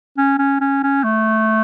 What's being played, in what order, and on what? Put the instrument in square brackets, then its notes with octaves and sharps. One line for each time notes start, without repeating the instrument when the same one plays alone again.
[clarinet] C#4
C#4
C#4
C#4
A3